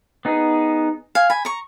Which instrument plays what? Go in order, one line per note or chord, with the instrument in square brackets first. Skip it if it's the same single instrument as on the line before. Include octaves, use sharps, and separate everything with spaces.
[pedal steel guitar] B3 D#4 G#4
[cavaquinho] F5 G#5
G#5 B5
A#5 C#6